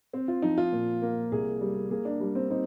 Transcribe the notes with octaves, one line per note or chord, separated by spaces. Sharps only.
C4
F4
F3 D#4
F4
A#2
A#3
C2 G#4
G3
A#3 G#4
D4
G3 D4
C4
C4 D#4